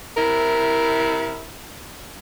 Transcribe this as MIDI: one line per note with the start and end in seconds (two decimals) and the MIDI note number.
0.17 1.51 48
0.17 1.51 64
0.17 1.46 70